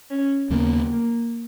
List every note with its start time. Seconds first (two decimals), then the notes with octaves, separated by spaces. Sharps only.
0.09 C#4
0.50 D#2 C#3 F#3 A#3 B3
0.92 A#3